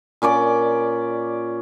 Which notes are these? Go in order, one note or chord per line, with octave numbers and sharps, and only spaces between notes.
A#2 C#4 D5 D6